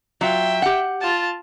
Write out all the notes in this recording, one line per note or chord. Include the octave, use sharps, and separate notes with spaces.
F#3 F4 E5 G5
G4 F#5
F4 A5